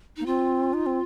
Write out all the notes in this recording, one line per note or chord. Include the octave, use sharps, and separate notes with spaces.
A#3 D#4
C4 F4
D#4
C4